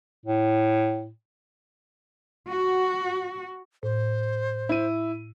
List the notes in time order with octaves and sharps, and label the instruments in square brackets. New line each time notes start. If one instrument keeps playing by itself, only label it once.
[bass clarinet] A2
[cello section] F#4
[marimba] A2 [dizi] C5
[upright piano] E4 D#7